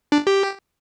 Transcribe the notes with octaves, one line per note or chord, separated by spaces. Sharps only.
D4
G4